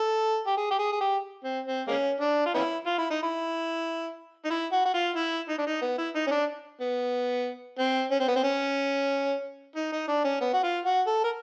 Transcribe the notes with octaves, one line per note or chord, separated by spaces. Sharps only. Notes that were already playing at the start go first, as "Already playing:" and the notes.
Already playing: A4
G4
G#4
G4
G#4
G#4
G4
C4
C4
G#3 A#3 C#4
D4
F4
B3 C#4 E4
F4
E4
D#4
E4
D#4
E4
F#4
F#4
F4
E4
D#4
D4
D#4
B3
E4
D#4
C#4
D4
B3
C4
C#4
C4
B3
C4
C#4
D#4
D#4
D4
C#4
B3
F#4
F4
F#4
A4
A#4